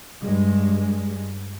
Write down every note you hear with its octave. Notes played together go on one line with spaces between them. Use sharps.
G2 G#3